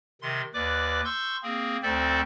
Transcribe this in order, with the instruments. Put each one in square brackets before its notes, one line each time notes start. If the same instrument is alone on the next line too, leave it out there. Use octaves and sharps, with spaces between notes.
[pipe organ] C3 D#3 C6
D#2 B4 D5 D6
C6 C#6 E6 G6
A#3 C4 G#4
D2 C4 A4 C5 D5 E5